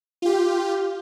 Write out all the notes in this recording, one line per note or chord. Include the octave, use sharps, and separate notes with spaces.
F4 G4